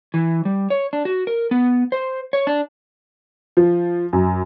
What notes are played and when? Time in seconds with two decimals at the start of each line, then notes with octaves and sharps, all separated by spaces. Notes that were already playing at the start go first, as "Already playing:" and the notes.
0.14 E3
0.45 G3
0.70 C#5
0.93 D4
1.05 F#4
1.27 A#4
1.51 B3
1.92 C5
2.33 C#5
2.47 D4
3.57 F3
4.13 F#2